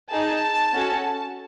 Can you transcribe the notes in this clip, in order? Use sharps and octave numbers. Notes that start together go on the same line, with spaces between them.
D#4 G#4 A5
C#4 F#4 A4